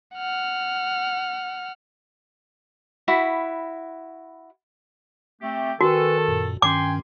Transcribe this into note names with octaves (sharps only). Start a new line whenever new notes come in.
F#5 F6
E4 F#4 B5
A3 C4 G4
D#3 F#4 A4 B4 G#5 A5
F#2 A#2
G2 D#3 C#4 G5 G#5 C6 D6